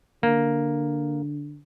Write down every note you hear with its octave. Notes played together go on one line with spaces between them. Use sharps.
D3 A#3